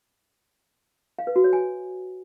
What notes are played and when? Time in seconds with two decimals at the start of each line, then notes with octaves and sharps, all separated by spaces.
1.19 F5
1.27 B4
1.36 F#4
1.44 C#5
1.53 G#5